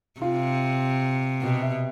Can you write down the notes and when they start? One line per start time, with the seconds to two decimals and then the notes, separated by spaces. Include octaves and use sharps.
0.21 C3 F4
1.42 B2 G4
1.62 E5